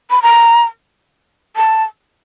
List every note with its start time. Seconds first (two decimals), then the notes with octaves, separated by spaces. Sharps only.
0.10 B5
0.22 A#5
1.56 A5